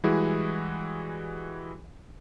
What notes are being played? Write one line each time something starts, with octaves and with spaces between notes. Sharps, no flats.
E3 G3 G#3 E4 F#4 G#4